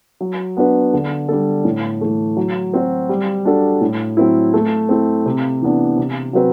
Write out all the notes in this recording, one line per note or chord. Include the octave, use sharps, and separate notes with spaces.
F#3
B3 D4 F#4 B4
D3
G3 D4 A4
A2
E3 A3
F#3
C4 F#4 C5
G3
D4 F#4 A4
A2
F#3 C4 E4
A3
C4 E4 A4
C3
E3 B3 D4
C3
F#3 C4 F#4 B4